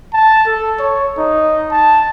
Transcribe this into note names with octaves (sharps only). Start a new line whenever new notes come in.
A5
A4
C#5
D#4
A5